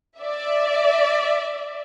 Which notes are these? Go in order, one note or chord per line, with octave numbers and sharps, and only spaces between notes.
D5 E5